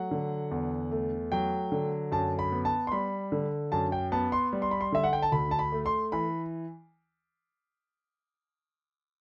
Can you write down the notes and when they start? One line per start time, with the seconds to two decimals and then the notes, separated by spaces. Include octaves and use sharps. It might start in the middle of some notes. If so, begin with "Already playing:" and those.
Already playing: F#3 A3 F#5
0.11 D3
0.51 E2
0.91 A3
1.32 F#3 G5
1.72 D3
2.12 F#2 A5
2.39 B5
2.52 B3
2.65 A5
2.87 C6
2.92 G3 B5
3.32 D3
3.72 F#2 A5
3.92 G5
4.12 B3 A5
4.32 C6
4.53 G3
4.62 C6
4.71 B5
4.81 C6
4.92 D3 E5
5.04 F#5
5.13 G5
5.22 A5
5.32 D2 B5
5.51 A5
5.59 B5
5.72 A3
5.86 C6
6.12 E3 B5